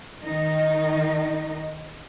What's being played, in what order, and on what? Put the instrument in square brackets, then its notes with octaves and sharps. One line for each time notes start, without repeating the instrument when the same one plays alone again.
[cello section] D#3 D#4